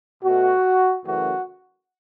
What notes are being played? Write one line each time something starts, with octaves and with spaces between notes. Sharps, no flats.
B2 A3 F#4
F#2 C#3 E3 A3 F#4